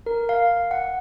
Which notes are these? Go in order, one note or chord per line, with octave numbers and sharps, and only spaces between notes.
A#4
F5
F#5